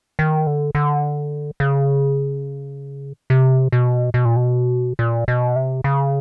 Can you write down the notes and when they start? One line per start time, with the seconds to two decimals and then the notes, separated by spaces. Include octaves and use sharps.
0.19 D#3
0.47 D3
0.75 D3
1.60 C#3
3.30 C3
3.72 B2
4.14 B2
4.25 A#2
4.36 B2
4.99 A#2
5.28 B2
5.56 C3
5.84 C#3